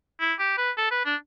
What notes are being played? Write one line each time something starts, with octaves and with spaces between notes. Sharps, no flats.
E4
G4
B4
A4
B4
D4